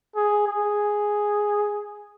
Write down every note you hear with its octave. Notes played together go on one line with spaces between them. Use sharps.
G#4
G#4